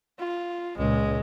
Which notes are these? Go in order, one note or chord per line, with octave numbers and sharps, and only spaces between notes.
F4
C#2 A#2 G#3